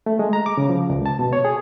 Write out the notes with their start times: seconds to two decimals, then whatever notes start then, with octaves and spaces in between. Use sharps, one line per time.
0.06 A3
0.19 G#3
0.33 A#5
0.46 D6
0.58 C#3
0.69 F3
0.90 C#2
1.06 A5
1.19 B2
1.33 C#5
1.45 G#4